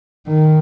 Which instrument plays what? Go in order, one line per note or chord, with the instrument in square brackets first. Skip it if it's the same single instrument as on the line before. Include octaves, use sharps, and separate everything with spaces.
[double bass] D#3